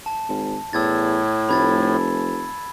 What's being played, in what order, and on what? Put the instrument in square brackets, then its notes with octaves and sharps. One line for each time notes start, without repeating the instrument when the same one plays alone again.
[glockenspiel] A5
[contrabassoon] G#1
[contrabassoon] E2 [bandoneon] A2 [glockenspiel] E6 G#6 A6
[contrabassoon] F1 [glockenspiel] B5 G#6 A6